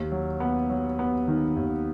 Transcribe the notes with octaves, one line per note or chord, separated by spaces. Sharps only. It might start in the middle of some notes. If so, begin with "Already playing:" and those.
Already playing: D#2
F#3
B3
F#3
B3
D#3
D#2